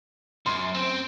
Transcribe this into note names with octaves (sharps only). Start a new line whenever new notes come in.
F#2 C6
C4 C5